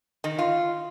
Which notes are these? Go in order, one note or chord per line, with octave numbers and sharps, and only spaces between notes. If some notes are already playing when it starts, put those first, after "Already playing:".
D#3
F4